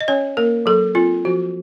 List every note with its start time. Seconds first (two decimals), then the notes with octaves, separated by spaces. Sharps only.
0.01 D#5
0.08 C#4 C#5
0.37 A#3 A#4
0.66 F#3 A4
0.95 C4 F4
1.25 F3 F#4